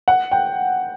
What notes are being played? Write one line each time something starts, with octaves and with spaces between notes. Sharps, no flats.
F#5
G5